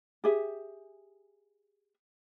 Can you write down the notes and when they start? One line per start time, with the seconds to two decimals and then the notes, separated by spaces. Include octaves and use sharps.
0.24 G4 G#4 E5